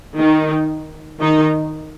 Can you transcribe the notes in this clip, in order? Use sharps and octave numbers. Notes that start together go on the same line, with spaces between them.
D#3 D#4
D#3 D#4